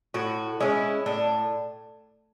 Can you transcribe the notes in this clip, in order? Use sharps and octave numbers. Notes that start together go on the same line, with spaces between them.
A2 F#4
G#3 C#4 E4
A2 D4